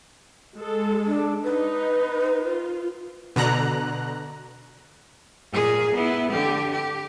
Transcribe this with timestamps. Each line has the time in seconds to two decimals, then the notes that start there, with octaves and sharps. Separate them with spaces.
0.57 G#3 A4
1.06 D4
1.43 D#4 B4
2.45 F4
3.36 B2 D3 A#5 F#6
5.52 A#2 G#4
5.95 B3 E4
6.30 D3 G4
6.72 G4